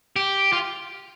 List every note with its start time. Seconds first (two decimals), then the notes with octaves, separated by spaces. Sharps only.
0.16 G4
0.53 F4